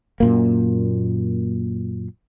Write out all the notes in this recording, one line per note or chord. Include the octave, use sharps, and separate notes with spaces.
F#2 A#2 A#3